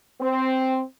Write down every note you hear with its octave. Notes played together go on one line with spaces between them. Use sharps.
C4